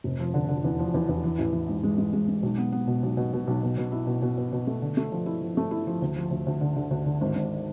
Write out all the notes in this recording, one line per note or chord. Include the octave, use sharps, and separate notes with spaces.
F1
F3
D3
D3
E2
F3
E2
E2
E3
A1
E3
G#2
G#3
G#3
G#3
G#3
B1
B3
B3
B2
B1
B2
B2
B1
B2
B2
E4
B2
B2
B2
B2
A3
D3
A3
F3
E4
F3
A3
E4
F3
D2
F3
D2
D2
D3
D3
D2
D3
G#1
G#1